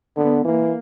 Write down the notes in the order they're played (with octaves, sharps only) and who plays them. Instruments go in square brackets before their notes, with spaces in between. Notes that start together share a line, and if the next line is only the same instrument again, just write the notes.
[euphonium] D3 [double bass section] B3
[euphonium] E3 [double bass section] A#3